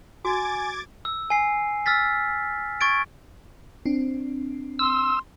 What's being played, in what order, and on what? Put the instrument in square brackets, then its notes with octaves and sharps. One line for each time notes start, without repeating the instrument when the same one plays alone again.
[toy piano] F#4 [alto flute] G#5 [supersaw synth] D6 G#6 A6
[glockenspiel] E6
G#5 C7
E6 F6 A6 B6
C#6 G#6 A6 D7
[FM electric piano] C4 D4
[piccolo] C6 [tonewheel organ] E6